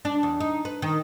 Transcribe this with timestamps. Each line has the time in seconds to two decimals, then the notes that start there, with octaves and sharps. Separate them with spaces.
0.05 D4
0.23 E2
0.40 D#4
0.65 B4
0.82 D#3